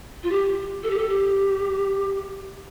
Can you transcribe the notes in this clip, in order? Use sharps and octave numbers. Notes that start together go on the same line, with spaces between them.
F4
G4
A4
G4
A4
G4